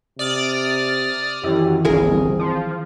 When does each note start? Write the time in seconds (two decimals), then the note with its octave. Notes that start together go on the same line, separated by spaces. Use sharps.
0.19 C3 D5 D#6 F6
1.44 F#2 D#3 E3 E4 G4
1.85 G1 C2 C4 G#4 A#4
2.40 F3